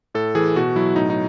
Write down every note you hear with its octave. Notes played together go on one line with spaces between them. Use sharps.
A2 A4
E3 G#4
B2 F#4
F#3 E4
A2 D#4
D#4